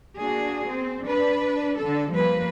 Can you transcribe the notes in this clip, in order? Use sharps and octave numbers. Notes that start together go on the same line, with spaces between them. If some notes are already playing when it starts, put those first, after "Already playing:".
A#3 D4 F#4 G#4
C4
D4 B4
D3 A4
F3 G3 A#3 B4